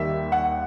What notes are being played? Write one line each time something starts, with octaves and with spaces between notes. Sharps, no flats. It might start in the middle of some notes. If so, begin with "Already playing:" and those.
Already playing: D#2 D#3 G3 E5
F#5